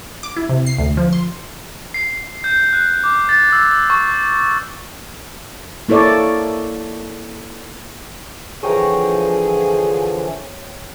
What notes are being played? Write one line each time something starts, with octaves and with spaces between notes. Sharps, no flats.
D6
E4
C3
C7
D2
F3
C6
C7
G6
F#6
D6
A6
E6
C#6
A#3 E4 A4 C#5 D5
D3 E3 F3 G#4 C#5 G5 A#5